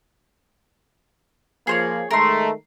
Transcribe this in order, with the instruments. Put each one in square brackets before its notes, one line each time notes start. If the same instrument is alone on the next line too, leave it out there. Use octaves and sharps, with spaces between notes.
[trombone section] F3 A#3 [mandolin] G#4 C5 C#5
[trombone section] D#3 G#3 A3 [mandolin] A#4 C6